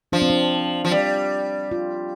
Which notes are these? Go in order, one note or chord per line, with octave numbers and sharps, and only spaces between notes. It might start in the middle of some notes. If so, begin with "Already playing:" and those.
F3 D4
C4
D4
F3
G3
F4